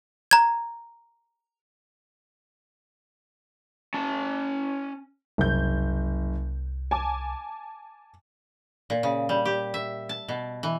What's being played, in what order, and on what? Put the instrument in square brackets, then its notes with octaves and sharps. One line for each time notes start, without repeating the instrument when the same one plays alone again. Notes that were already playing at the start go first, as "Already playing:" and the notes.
[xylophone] A#5 G#6
[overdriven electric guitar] C#4 A5
[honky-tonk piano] F#1 G6 [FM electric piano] C2
[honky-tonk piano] G#5 A5 D6
[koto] A#2
C#3
G3
G4
E5
A5
B2
E3